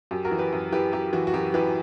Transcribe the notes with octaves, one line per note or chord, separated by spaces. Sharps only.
F#2 G4
F#4 A#4
E3
G4 B4
F#2
E3 G4 B4
F#2 G4
E3 F#4
F#4
F#2 G4
E3 G4 B4